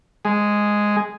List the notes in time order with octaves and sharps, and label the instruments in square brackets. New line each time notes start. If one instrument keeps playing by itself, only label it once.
[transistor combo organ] G#3